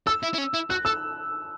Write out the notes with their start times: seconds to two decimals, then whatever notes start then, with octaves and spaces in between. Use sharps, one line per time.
0.07 A4 E6
0.23 E4
0.34 E4
0.38 C#4
0.54 E4
0.70 F#4 F#6
0.85 A4 E6